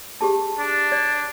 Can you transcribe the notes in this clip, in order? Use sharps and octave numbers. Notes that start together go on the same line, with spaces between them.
G4 G#4 A5
D4
D5